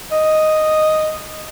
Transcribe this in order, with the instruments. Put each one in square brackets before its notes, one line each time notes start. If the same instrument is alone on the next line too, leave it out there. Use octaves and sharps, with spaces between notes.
[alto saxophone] D#5